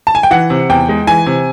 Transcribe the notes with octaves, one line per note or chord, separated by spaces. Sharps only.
A5
G#5
G5
E3 F#5
C3
E2 G5
G#3
E3 G#5
C3